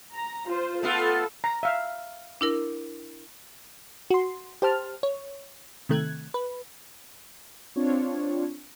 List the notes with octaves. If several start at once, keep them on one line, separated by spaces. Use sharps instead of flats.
A#5
F4 C5
A3 B3 F4 A4
A#5
E5 F5
D4 E4 A#4
F#4 C6
G4 C5 A5 F6
C#5
C3 D#3 A3 F#6 G#6
B4
C4 D4 F4 C#5